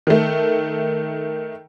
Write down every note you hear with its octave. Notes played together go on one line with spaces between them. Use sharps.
D#3 A3